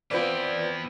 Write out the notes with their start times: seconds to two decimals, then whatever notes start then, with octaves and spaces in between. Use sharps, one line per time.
0.11 B3 C4 E4 F4 B4 D5